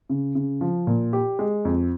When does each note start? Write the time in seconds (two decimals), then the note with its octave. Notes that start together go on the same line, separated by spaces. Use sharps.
0.09 C#3
0.35 C#3
0.61 F3
0.87 A#2
1.13 G4
1.39 G#3
1.65 F2